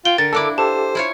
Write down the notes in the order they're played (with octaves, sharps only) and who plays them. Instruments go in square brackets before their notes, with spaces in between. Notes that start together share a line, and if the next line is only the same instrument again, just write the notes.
[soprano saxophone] F4 [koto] G5 [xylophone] G7
[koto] D3 [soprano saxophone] A#4 [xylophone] A6
[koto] A#3 D4 E4 [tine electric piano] A4 D6
[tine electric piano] G4 A4 [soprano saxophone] C5 [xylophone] A5
[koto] E4 F4 C#5